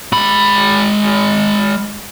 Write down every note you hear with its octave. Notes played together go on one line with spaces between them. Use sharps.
G#3 B5